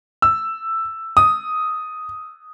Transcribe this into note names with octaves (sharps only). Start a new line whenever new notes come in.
E6
D#6